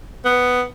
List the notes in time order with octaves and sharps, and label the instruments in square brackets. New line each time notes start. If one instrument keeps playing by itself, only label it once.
[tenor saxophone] B3